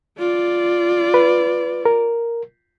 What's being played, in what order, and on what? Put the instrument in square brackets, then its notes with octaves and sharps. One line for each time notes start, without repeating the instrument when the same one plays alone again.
[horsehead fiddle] F4 D5
[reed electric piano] B4
A#4